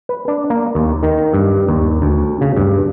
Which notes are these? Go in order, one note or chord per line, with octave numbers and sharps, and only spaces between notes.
B4
D4
A#3
D#2
D#3
G2
D#2
D2
C#3
G2